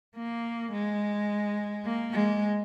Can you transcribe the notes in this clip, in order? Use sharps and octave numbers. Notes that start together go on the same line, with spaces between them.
A#3
G#3
A#3
G#3